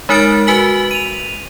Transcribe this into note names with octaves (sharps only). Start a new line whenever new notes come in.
G#3 D#4 A#4 F6 A6 D7
F#4 B4 G#5 B6 F#7
D#7 F7